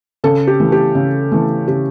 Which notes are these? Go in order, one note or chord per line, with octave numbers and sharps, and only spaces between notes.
C#3 A4
G4
E3 A3
G4
C#3
E3 A3
C#3 G4